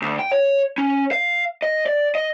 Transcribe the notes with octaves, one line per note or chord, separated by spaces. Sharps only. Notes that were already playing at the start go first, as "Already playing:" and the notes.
D2
G5
C#5
C#4
F5
D#5
D5
D#5